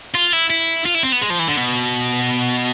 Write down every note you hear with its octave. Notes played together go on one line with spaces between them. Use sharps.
F4
E4
E4
F4
E4
C4
B3
G#3
F3
E3
D3
B2